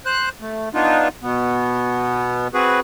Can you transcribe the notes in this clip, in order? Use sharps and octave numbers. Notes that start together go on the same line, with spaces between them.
C5 F#6
A3
B3 D4 D#4 F4
B2 B3
C4 F#4 G#4 B4